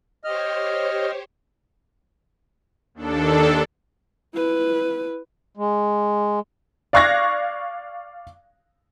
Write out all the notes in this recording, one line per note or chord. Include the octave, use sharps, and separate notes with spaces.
G4 C5 C#5 D#5 F6
D#2 D4 A4
E4 B4
G#3
D5 F5 C#6 F#6 G#6 A#6